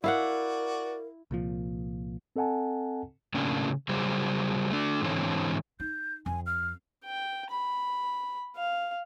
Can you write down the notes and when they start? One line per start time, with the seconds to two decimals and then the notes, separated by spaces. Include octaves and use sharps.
0.04 E4 F#4 A#4 D5 F5 F#5
1.31 C2 A#2 F3
2.36 C4 A4 D#5 F#5 G#5 A5
3.34 A2 C#3 A#3 C#4 D4
3.89 C#3 F#3 G3 G#4 C5
4.71 A3 D4
5.02 G#2 D3 E3 C4 A4 C#5
5.80 D#4 G6
6.26 F2 G#5
6.46 F6
7.04 G5
7.50 B5
8.57 F5